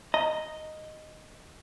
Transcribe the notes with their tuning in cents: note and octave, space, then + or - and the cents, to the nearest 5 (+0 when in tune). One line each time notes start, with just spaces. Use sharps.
D#5 +0 A#5 +0